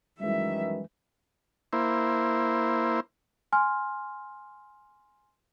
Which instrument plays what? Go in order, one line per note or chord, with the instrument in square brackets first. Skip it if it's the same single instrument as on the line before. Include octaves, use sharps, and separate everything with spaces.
[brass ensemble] F#2 D#3 E3 [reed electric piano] G3 G#3 [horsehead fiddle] E5
[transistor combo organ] A#3 E4 C5
[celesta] G#5 C6 F6